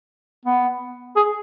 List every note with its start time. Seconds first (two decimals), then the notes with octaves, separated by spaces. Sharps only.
0.45 B3
1.16 G#4